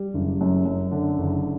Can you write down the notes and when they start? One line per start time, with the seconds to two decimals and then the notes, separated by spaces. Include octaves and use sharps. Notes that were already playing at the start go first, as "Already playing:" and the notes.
Already playing: G3
0.14 F#1
0.41 F#2
0.65 F#2
0.91 D3
1.18 F#1